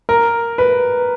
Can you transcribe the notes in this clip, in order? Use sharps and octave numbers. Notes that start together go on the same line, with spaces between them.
A#4
B4